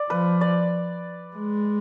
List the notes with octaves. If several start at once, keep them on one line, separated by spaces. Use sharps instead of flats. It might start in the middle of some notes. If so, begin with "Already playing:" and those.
Already playing: D5
F3 B4
D5
G#3